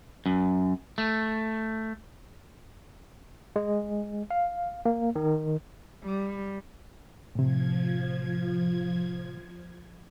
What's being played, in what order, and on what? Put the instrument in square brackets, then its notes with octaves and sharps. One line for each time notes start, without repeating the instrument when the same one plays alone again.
[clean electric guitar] F#2
A3
[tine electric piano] G#3
F5
A#3
D#3
[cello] G3
[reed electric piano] A2 C3 [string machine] F3 G#6